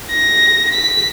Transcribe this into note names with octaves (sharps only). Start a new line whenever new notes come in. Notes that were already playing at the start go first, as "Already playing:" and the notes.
A#6
B6